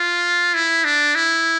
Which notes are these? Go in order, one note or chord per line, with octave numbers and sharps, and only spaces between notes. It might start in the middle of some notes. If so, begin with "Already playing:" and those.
Already playing: F4
E4
D4
E4